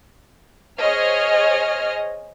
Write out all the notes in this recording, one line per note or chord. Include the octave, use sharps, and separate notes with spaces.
G#4 C5 C#5 D#5 F6